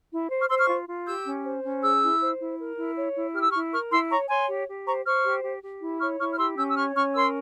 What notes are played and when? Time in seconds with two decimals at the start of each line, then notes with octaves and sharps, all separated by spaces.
0.11 E4
0.31 C5
0.40 C#6 F6
0.49 C5 C6 E6
0.59 C#6 F6
0.69 F4
0.88 F4
1.06 G4 E6 G6
1.26 C#4
1.45 C5
1.63 C#4
1.82 G#4 E6 G6
2.01 E4
2.21 C5
2.39 E4
2.59 A#4
2.78 E4
2.96 C#5
3.16 E4
3.34 G4 F6
3.43 E6
3.52 C#6 F6
3.54 E4
3.73 A#4 C#6 F6
3.92 E4 C6 E6
4.11 C#5 A#5 C#6
4.30 C#5 G#5 C6
4.49 G4
4.67 G4
4.87 C5 A#5 C#6
5.05 C5 C#6 F6
5.25 G4
5.43 G4
5.63 G4
5.81 E4
6.00 C#5 C#6 F6
6.20 E4 C#6 F6
6.31 F6
6.38 G4 C6 E6
6.58 C#4 E6 G6
6.69 E6
6.77 C#5 C#6 F6
6.95 C#4 C#6 F6
7.14 A#4 C6 E6